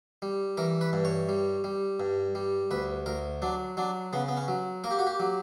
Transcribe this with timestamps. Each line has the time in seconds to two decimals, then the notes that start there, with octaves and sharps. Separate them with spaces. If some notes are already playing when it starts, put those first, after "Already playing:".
0.22 G3
0.57 E3 A#4
0.81 B4
0.93 G2
1.05 C#5
1.29 G3
1.64 G3
2.00 G2
2.35 G3
2.71 D2 B4
3.06 D2 A#4
3.42 F#3 D4
3.77 F#3 D4
4.13 C#3 B3
4.28 B3
4.37 C#4
4.48 F#3
4.84 A#3 A#4
4.91 G4
4.99 F#4
5.07 G4
5.20 F#3